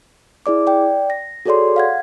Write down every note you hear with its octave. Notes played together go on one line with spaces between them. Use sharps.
E4 G#4 D5 D6
D5 G5
A#6
F#4 G#4 A4 C#5 D5 C6
F5 F#5 G#6